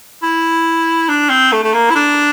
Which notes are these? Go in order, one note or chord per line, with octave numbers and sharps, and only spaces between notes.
E4
D4
C4
A3
A3
A#3
E4
D4